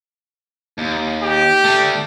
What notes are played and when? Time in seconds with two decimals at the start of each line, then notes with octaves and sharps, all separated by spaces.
0.78 D#2
1.23 G4
1.64 D3 A3